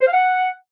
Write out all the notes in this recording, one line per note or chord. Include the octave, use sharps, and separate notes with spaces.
C5
F5
F#5